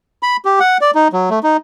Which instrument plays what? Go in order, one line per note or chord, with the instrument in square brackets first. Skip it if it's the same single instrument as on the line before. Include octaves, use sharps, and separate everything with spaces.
[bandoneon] B5
G4
F#5
D5
D#4
F#3
A3
D#4